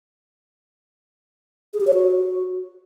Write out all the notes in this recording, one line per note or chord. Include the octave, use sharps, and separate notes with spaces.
G#4
G4
C#5
F#4